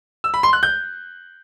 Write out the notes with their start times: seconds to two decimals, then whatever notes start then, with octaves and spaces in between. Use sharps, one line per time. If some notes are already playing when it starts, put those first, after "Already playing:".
0.24 E6
0.34 B5
0.43 C6
0.53 F#6
0.63 G6